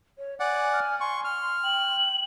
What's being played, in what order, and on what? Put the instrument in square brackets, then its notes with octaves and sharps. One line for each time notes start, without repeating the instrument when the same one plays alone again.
[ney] C#5
[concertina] D5 F#5 [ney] G#5
[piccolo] F6
[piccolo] C6 [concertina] C#6
[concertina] F6
[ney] G5 [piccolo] F#7